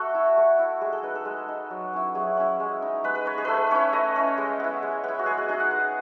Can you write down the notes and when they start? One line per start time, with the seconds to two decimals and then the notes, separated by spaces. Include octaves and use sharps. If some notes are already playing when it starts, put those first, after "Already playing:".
Already playing: A3 F#4 A4
0.14 E4
0.37 A3
0.59 E4
0.81 G#3 G#4
0.92 A4
1.03 D#4 B4
1.15 A4
1.25 G#3
1.48 D#4
1.70 F#3
1.93 C#4 E4
2.15 F#3 G#4
2.37 C#4 E4
2.60 G#3
2.82 D#4
3.04 G#3 B4
3.15 B4
3.26 D#4 C#5
3.38 G#4
3.45 A3 A4 B4
3.71 C#4 E4 C#5
3.93 A3 D#5
4.16 C#4 E4
4.38 G#3
4.60 B3 E4
4.82 G#3
5.04 B3 E4
5.19 F#4
5.26 G#3 G#4
5.38 F#4
5.48 D#4 G#4
5.60 F#5
5.71 G#3